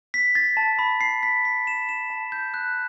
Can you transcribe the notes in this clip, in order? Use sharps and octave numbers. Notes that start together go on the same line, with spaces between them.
B6
A6
A5
B5
C7
B6
B6
E7
E7
A5
G6
F#6